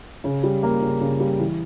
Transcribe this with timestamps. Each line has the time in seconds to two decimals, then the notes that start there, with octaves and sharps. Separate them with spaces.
0.24 C#3
0.43 G3
0.63 A#3
0.82 C#3
1.01 C#3
1.20 G3
1.40 E3